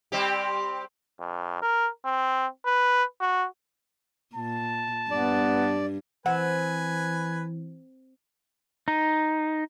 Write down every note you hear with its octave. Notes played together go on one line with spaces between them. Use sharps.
G3 C4 G4
F2
A#4
C4
B4
F#4
A#2 A5
G2 B3 D5
E3 C4 B4 F#5 G#5
D#4